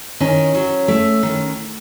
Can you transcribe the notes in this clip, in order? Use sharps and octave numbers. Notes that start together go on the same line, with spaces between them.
D#3 C#4
F#3
A3
D#3